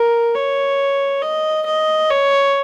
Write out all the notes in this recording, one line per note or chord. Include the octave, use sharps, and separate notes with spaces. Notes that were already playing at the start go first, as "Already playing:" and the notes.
Already playing: A#4
C#5
D#5
D#5
C#5